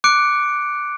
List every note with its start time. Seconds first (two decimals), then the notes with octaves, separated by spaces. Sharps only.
0.04 D6 F#6 C#7 D7